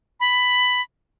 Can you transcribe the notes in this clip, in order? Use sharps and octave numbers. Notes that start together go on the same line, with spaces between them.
B5